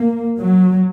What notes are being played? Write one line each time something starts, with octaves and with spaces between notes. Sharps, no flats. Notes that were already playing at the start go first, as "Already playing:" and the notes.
Already playing: A#3
F#3